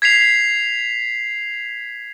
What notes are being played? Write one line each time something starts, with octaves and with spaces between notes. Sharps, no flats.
G#6 B6 C7 F7